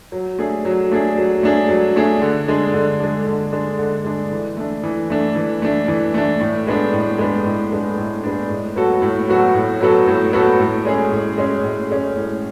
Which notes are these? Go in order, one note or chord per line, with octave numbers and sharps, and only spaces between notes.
F#3
A3 D4 G#4
F#3
A3 D4 G#4
F#3
A3 D4 G#4
F#3
A3 D4 G#4
D3
G#3 D4
D3
G#3 D4
D3
G#3 D4
D3
G#3 D4
E3
A3 D4
E3
A3 D4
E3
A3 D4
E3
A3 D4
A2
G#3 B3 D4
A2
G#3 B3 D4
A2
G#3 B3 D4
A2
G#3 B3 D4
A2
F#3 B3 F#4 A4
A2
F#3 B3 F#4 A4
A2
F#3 B3 F#4 A4
A2
F#3 B3 F#4 A4
A2
G#3 C#4 G#4
A2
G#3 C#4 G#4
A2
G#3 C#4 G#4
A2